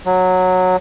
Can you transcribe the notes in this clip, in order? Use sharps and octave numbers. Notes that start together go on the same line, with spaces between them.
F#3